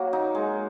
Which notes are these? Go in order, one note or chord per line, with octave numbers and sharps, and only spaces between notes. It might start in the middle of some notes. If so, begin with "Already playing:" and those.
Already playing: F#3 A#3 F#4
D#4
G#3